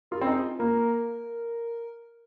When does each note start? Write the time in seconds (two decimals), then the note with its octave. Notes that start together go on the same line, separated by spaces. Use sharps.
0.11 F4 A#4
0.21 C4
0.27 D#4 G#4
0.43 F4
0.59 A#3 A#4